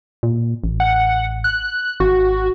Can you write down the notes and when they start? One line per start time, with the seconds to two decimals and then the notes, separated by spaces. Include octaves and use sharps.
0.23 A#2
0.64 A1
0.80 F#5
1.44 F#6
2.00 G#1 F#4